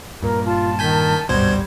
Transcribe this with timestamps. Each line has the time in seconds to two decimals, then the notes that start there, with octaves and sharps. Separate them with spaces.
0.22 G2 A#2 A#4
0.46 F4 A5
0.79 D#3 G#5 G6 B6
1.29 D1 G#1 G2 B2 G3 C5 G#6